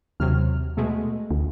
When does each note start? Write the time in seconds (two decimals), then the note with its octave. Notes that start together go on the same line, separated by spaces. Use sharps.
0.20 D#2 C3 F#3 F6
0.77 B2 G#3 A3
1.31 D2